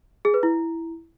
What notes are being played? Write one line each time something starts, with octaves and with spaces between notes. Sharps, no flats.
G#4
B4
E4